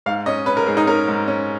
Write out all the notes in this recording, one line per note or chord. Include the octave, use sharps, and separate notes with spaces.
G#2 F5
C#4 D#5
C#4 B4
A#4
G#2 G#4
D#4
C#4 A#4
G#2
C#4